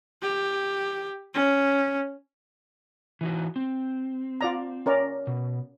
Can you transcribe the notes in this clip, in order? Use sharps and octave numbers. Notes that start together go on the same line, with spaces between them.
G4
C#4
E3 D#4 F#4
C4
F4 D5 A#5
C#4 A#4 D5
B2